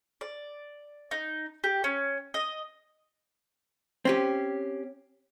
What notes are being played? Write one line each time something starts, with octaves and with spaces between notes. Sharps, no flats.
D5
D#4
G4
C#4
D#5
C4 C#4 G4